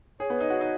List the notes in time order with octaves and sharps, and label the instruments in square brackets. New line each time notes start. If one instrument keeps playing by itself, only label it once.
[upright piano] G#4 [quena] C#5
[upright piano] B3
D#4
F#4
D#4